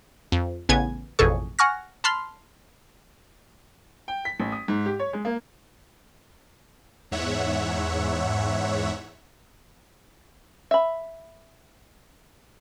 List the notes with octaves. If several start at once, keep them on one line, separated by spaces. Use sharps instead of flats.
F2
A1 C#3 B3 G#5 G#6
A1 F2 B2 G#4 A4 C#6
F#5 G#5 C#6 F6 A#6
A5 B5 C6 F6
G5
B6
A1
D#6
G#2
G4
C#5
G#3
A#3
E2 G#2 C#5 E5 F#5
E5 B5